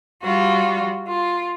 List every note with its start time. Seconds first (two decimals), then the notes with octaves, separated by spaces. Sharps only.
0.23 G3 F4 F#4
1.08 F4